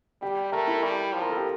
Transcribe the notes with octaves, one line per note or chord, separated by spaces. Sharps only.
G3 G4
A3 A#4
E4
G3
F3
A#4
A4
G4